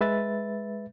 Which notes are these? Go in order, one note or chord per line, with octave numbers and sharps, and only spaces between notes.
G#3 B4 E5 A6